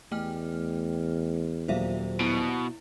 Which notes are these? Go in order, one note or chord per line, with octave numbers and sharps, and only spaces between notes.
E2 A3 G5 F6
D#1 A#2 F#3 C5 E5 F5
B2 E4